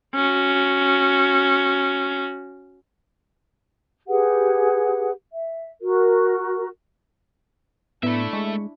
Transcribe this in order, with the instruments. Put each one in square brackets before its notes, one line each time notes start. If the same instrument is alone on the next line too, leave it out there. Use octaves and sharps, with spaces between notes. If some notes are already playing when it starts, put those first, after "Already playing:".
[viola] C#4 F#4
[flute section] G4 G#4 B4 F#5
E5
F#4 A#4
[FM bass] A2 [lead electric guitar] A3 E5 [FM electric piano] B3 [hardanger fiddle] D4 E4
[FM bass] G#3 [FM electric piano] C#6